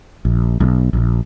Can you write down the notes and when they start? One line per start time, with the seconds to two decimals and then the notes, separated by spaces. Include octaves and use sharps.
0.25 A#1
0.60 B1
0.93 A#1